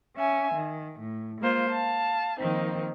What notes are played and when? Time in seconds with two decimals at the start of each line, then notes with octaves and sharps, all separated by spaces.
0.16 C#4 E5 G#5
0.54 D#3
0.99 A2
1.41 G#3 A#3 F4 C5
1.70 F5 A5
2.40 D#3 F3 A#3 C4 D#4